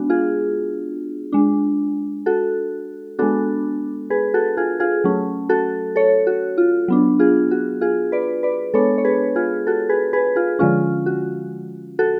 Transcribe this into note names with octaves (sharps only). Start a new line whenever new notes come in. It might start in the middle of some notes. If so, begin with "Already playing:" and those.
Already playing: G#3 B3 D4 F#4
F4 G#4
G#3 D4
F#4 A4
G#3 B3 D4 F#4 A4
G#4 B4
F#4 A4
F4 G#4
F4 G#4
F#3 A3 C#4
F#4 A4
A4 C#5
F#4
F4
F#3 B3 D4
F4 G#4
F#4
F4 G#4
B4 D5
B4 D5
G#3 B3 D4 A4 C#5
C#5
G#4 B4
F4 G#4
F#4 A4
G#4 B4
G#4 B4
F4 G#4
D3 F3 G#3 C#4 F4
F#4
F#4 A4